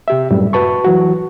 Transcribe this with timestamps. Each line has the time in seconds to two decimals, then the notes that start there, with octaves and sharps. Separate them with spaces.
0.08 C3 G4 E5
0.31 F#2 A2 G3
0.53 F#4 B4 A5 C#6
0.85 E3 F#3 F#4